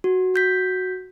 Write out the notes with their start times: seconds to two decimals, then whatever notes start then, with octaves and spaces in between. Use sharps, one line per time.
0.04 F#4
0.34 F#4 G6 B6